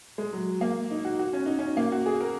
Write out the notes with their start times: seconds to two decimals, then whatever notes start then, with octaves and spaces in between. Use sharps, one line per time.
0.18 G#3
0.33 F#3
0.61 A#3
0.91 D#4
1.05 F#4
1.19 F#4
1.33 C#4
1.46 D#4
1.59 C#4
1.77 A#3
1.92 F#4
2.06 G#4
2.21 A#4